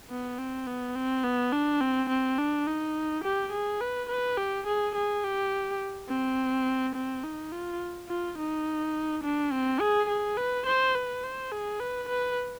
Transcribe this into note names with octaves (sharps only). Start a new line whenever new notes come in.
B3
C4
B3
C4
B3
D4
C4
C4
D4
D#4
G4
G#4
B4
B4
G4
G#4
G#4
G4
C4
C4
D#4
F4
F4
D#4
D4
C4
G#4
G#4
B4
C5
B4
C5
G#4
B4
B4